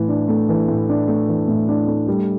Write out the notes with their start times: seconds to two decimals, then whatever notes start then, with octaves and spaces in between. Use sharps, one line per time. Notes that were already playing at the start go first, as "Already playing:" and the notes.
Already playing: A2 E3
0.08 D4
0.28 A3
0.49 E3
0.68 A2
0.89 D4
1.08 A3
1.28 E3
1.48 A2
1.68 D4
1.87 A3
2.08 G3